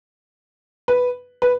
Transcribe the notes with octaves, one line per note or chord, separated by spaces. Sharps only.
B4
B4